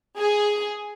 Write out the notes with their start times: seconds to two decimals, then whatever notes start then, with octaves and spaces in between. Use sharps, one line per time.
0.18 G#4